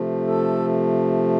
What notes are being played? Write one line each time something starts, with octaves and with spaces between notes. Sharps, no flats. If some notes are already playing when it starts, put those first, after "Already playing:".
Already playing: C3 F3 A3
A4